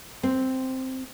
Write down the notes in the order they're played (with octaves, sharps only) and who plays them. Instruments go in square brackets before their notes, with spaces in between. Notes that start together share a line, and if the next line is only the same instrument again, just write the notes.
[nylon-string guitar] C4